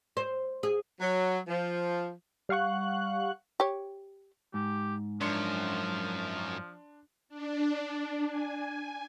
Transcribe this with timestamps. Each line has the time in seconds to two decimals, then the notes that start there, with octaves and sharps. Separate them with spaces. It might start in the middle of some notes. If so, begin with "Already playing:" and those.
0.17 C5
0.63 G#4
1.00 F#3
1.48 F3
2.49 G3 F5 F#5 C#6 F#6
3.60 G4 C#5
4.54 G#2 G4
5.21 F#2 F3 D4 C6 C#7
7.29 D4
8.27 G#5